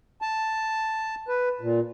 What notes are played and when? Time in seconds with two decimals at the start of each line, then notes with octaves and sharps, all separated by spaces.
0.22 A5
1.28 B4
1.61 A#2